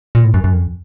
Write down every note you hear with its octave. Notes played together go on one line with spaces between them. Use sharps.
A#2
A2
F#2
F#2
F2